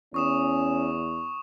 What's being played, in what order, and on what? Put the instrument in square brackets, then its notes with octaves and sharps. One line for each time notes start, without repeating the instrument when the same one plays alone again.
[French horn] E2 [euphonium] C#4 [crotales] C#6 D#6 E7